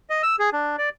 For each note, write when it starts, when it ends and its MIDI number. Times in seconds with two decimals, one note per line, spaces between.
0.10 0.22 75
0.23 0.36 88
0.39 0.50 68
0.53 0.76 62
0.78 0.89 74